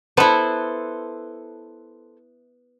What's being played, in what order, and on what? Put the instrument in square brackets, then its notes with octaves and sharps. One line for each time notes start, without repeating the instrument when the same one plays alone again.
[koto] B3 E4 [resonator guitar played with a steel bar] A4 B4 C5